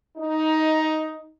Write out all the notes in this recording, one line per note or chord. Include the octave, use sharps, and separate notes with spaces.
D#4